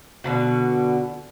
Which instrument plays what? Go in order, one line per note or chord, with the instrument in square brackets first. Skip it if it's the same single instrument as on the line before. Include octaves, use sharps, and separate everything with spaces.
[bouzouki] B2 D3 F#4